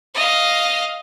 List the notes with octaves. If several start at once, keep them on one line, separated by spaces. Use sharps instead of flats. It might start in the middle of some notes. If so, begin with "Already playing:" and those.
D#5 F5